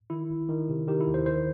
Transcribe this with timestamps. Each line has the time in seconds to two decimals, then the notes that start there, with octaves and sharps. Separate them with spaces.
0.10 D#3 E4
0.30 G1
0.49 D#3
0.69 C3
0.88 D#3 G4
1.01 E4
1.07 D#2
1.14 C5
1.26 D#3 C5